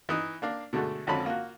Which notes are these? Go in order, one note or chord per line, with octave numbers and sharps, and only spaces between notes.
E3 D#4 D#5
A#3 D4 F5
B2 D3 G#3 A3
G#1 F2 D3 C#4 A5 B5
A#3 F4 F#4